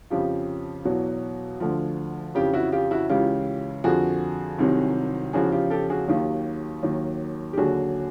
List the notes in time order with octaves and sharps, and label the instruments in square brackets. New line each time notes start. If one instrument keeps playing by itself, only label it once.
[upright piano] F2 C#3 F3 F4 G4
E2 B2 F#3
D2 D3 F3
F2 C#3 E3 F4 G4
E4 F#4
F4 G4
E4 F#4
C#2 C#3 E3 F4 G4
F2 D3 F3 F#4 G#4
C2 C3 D#3 F#3
E2 C#3 F3 F#4 G#4
F4 G4
G4 A4
F#4 G#4
D#2 D#3 F#3 F4 G4
D#2 D#3 F#3
G4
D#2 D3 F#3 F#4 G#4